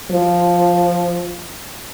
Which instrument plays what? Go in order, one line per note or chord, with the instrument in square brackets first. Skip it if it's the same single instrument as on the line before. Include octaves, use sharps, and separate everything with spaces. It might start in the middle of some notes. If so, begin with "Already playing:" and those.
[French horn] F3